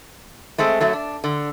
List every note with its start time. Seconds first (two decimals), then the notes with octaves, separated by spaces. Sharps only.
0.58 G#3 A3 C4 G#4
0.80 F#2 F#3 A3
0.93 D4
1.24 D3